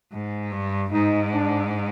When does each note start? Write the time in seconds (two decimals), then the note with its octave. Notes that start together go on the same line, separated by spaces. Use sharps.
0.12 G#2
0.52 G2
0.93 G#2 D#4
1.34 D4